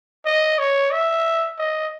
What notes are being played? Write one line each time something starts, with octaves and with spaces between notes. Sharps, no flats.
D#5
C#5
E5
D#5